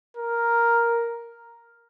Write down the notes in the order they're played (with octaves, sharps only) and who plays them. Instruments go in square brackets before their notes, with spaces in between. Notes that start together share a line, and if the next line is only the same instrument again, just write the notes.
[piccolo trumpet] A#4